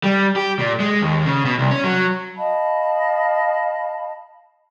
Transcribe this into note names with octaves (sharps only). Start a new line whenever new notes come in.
G3
G4
A#2
G#3
D#2
C#3
B2
C2
C#4
F#3
D#5 F5 A5 B5